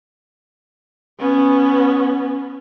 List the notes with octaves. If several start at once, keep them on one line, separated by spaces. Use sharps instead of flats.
B3 C#4